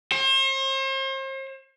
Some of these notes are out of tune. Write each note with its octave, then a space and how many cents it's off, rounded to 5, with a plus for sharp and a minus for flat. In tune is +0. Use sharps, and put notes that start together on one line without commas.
C5 +40